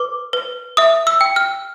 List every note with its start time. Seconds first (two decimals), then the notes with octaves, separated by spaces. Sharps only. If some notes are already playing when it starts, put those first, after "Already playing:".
Already playing: B4 D6
0.33 B4
0.77 E5 D#6
1.07 E6
1.21 G5
1.36 F6